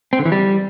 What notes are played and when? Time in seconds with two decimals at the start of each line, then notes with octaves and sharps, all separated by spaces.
0.13 C4
0.19 D3
0.25 E3
0.32 G3